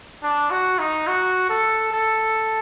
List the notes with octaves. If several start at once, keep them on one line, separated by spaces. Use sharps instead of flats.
D4
F#4
D#4
F#4
A4
A4